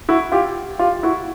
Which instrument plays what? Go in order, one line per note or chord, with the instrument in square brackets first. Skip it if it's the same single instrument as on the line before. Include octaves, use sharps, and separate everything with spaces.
[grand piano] E4 F#4
F4 G4
F4 G4
E4 F#4